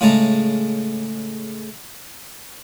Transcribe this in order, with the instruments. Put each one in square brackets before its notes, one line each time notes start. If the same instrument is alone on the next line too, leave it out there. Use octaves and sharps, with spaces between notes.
[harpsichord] A2 C#3 G#3 A3 A5 A#5